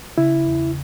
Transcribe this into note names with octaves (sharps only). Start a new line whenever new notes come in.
C#3 E4
E2